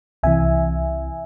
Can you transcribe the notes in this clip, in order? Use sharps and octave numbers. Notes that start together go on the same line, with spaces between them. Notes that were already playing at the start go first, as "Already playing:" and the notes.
C2 C3 E3 E5 G#5